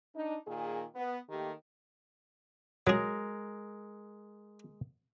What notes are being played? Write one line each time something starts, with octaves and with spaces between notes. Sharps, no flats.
D4 D#4
A#2 D#3 A#3 G#4
B3
D#3 A3 A#3 G4
F#3 G#3 G#4 A#4